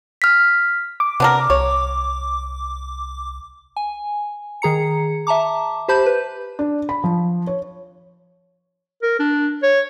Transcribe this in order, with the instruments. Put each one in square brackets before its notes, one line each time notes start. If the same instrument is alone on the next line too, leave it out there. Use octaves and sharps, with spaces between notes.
[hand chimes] F6 B6
[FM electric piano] D6
[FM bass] C3 [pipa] B3 D4 A#4
[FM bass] C2 [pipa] C#5
[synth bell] G#5
D#3 G#4 A#5 C#7
E5 A5 A#5 D6
G4 C5 A5 B5 G6
B4
[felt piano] D4
B5
F3
C#5
[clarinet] A#4
D4
C#5